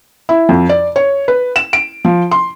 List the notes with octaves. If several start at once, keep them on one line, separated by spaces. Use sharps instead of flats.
E4
F2
D5
C#5
B4
E7
D7
F3
C6